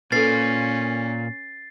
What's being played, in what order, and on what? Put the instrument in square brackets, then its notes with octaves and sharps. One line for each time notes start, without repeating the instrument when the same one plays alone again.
[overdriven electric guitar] A#2 A#3 [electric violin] C#4 [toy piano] A4 B4 [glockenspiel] A6 C7